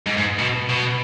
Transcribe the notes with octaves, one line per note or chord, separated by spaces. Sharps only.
G#2
G#2
B2
B2